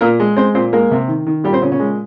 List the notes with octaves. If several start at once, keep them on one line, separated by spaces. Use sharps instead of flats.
A#2 A#3 A#4
G#3
G#3 C4 C5
A#2 C4 C5
G#3 A#3 A#4
C3
D#3
D#3
A#2 G3 G4
C4 C5
A#2 C#3 C#4
C#3 C#4
G#3